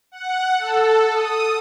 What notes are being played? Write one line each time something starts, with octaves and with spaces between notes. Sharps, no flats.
F#5
A4
D#6